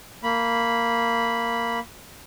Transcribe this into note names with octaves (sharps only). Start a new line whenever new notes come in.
A#3 B5